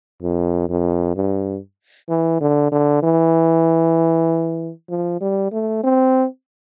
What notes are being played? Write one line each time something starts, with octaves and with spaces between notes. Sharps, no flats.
F2
F2
G2
E3
D3
D3
E3
F3
G3
A3
C4